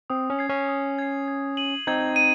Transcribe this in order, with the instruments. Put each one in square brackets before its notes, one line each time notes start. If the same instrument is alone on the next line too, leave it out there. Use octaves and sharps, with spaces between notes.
[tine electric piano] C4 [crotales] D#6
[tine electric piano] C#4
[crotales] G#6 C7
[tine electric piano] C#4
[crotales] D#6
G#6 C7
G#6
D#7 F#7
[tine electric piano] C4 D#4 [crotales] G#6
[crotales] D#7